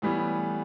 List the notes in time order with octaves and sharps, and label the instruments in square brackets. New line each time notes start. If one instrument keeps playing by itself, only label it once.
[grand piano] A2 E3 G3 B3